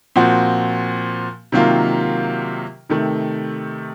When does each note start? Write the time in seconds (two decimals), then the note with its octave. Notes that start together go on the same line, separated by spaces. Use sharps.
0.16 A#2 F3 C4 F#4
1.52 C3 D#3 F#3 A#3 F4
2.89 C3 D#3 A3